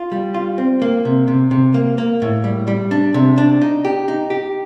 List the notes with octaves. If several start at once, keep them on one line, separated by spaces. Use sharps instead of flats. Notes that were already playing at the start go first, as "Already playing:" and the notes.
Already playing: F4
G3
F4
C4
A#3
C3
C3
C3
A#3
A#3
A2
G3
G3
D4
C3
D4
D#4
G4
D#4
G4